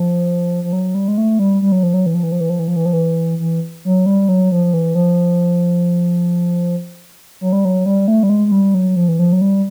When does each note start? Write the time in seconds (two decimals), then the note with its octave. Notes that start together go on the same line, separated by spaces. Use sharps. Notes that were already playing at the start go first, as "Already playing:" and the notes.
Already playing: F3
0.64 F3
0.73 F#3
0.95 G3
1.08 G#3
1.18 A3
1.39 G3
1.62 G3
1.72 F#3
1.83 F3
1.94 F#3
2.06 E3
2.15 F3
2.23 E3
2.32 F3
2.41 E3
2.50 F3
2.59 E3
2.68 F3
2.76 E3
2.86 F3
2.93 E3
3.39 E3
3.85 F#3
4.06 G3
4.29 F#3
4.52 F3
4.74 E3
4.95 F3
7.41 F#3
7.53 G3
7.65 F#3
7.86 G3
8.08 A3
8.23 G3
8.30 G#3
8.47 G#3
8.52 G3
8.74 F#3
8.96 F3
9.08 E3
9.19 F3
9.33 F#3
9.41 G3